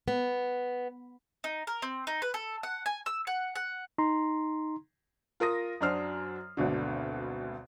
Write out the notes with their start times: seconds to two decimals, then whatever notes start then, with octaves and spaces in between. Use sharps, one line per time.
0.08 B3
1.44 D#4
1.67 A#4
1.82 C4
2.07 D#4
2.22 B4
2.34 A4
2.63 F#5
2.86 G#5
3.06 E6
3.27 F#5
3.56 F#5
3.98 D#4 A#5 C6
5.40 F4 A#4 D#6 A#6
5.81 F#2 F#3 D4 C5 F6 C7
6.57 G#1 D2 B2 D3